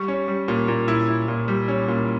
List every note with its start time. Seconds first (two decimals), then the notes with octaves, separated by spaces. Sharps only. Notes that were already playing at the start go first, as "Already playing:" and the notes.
Already playing: G3 C#6
0.08 C#4
0.28 G3
0.48 A#2
0.68 A#2
0.88 E4
1.08 E4
1.28 A#2
1.48 G3
1.68 C#4
1.88 A#2